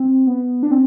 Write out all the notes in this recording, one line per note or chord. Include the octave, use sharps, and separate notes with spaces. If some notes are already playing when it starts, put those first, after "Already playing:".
Already playing: C4
B3
D4
C4